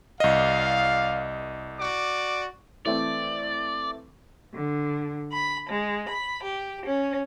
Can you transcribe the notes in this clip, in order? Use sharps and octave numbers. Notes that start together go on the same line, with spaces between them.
C2 D5 D#5 F5
F#4 D5 D6
E3 A3 C4 D5
D3
B5
G#3
B5
G4
C#4